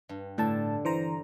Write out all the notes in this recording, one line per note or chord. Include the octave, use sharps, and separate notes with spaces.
G2
A2 D3 A5
E3 C5 A#5